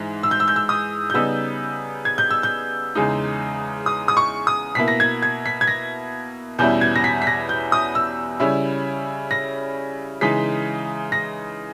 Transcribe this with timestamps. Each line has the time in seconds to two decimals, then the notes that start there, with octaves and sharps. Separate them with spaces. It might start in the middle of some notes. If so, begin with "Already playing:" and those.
Already playing: G#2 E3 G#3
0.23 E6
0.31 G6
0.40 E6
0.48 G6
0.56 E6
0.69 D#6
1.10 G6
1.14 C#3 G3 B3 D#4 E6
2.05 G#6
2.18 G6
2.30 E6
2.43 G6
2.95 E2 C#3 G#3 D#4
3.86 D#6
4.08 D#6
4.17 C#6
4.47 D#6
4.75 B2 A#3 E4 B6
4.88 A#6
5.00 G#6
5.22 G#6
5.46 B6
5.61 G#6
5.67 A#6
6.59 E2 B2 G3 C#4 E4 G6
6.81 G#6
6.96 A#6
7.04 B6
7.22 B6
7.27 A#6
7.49 G6
7.72 D#6
7.95 E6
8.40 C#3 G3 C#4 E4
9.31 A#6
10.21 C#3 E3 G#3 D#4 B6
11.12 A#6